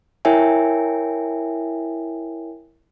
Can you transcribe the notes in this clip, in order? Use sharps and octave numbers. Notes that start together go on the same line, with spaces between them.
E4 A#4 C#5 E5 G5 G#5